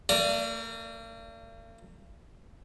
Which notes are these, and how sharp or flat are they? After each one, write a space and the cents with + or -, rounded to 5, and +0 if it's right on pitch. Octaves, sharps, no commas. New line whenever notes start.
A#3 -45 A#4 +25 D5 +0